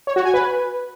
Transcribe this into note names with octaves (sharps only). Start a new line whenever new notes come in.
C#5
F#4
G#5
B4